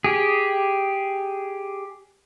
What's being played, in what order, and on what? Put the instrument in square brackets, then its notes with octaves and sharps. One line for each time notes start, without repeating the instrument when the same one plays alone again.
[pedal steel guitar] G4 G#4